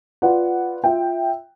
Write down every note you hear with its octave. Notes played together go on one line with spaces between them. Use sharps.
F4 B4 D5 F#5
F4 E5 G5